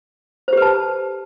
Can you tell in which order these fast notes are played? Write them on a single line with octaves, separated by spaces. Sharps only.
C5 G4 B4 A5